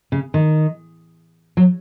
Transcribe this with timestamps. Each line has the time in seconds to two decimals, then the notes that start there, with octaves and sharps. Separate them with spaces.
0.12 C#3
0.34 D#3
1.57 F#3